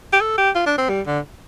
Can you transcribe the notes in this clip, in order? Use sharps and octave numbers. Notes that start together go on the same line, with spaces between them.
G4
A4
G4
F4
D4
C4
G3
D3